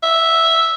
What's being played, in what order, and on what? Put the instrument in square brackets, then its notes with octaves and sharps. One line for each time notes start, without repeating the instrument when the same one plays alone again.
[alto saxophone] E5